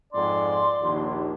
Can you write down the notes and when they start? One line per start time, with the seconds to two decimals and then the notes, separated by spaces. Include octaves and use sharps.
0.13 F2 G#2 D5 C6
0.80 A#1 D#2